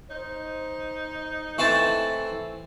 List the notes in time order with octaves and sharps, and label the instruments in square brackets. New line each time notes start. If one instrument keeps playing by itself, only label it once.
[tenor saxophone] D#4 [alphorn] C5
[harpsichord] E3 A3 C4 [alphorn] A4 [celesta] C#6 A6